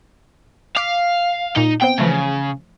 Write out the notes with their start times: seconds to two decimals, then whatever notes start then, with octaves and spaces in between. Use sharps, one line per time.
0.76 F5 D6 F6 B6
1.57 A#2 D#4
1.82 B3 C4 C5 G5
1.99 C#3 E3 F3 A3